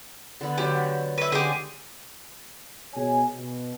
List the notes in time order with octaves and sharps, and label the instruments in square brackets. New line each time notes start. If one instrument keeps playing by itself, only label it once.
[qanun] D3 B3
[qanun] D3 F#3 A3 [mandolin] G4
[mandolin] B4 E5
[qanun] D3 G#3 C#4 [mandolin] G4 G#4
[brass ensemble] B2 G#4 C#5 G#5
B2